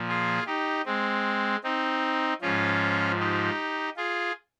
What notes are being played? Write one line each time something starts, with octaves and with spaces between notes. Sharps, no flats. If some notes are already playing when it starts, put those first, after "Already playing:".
Already playing: A#2 F3
F4 G#4
D#4 G4
G#3 C4
C4 D#4
G#2 F3 C#4 F4
D#4 G4
F4 G#4